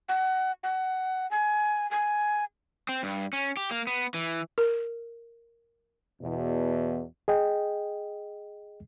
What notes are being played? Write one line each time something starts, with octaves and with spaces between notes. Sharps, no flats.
F#5
F#5
G#5
G#5
C4
G2
C#4
G4
A#3
B3
E3
A#4
E2 B2
G#4 D#5 G5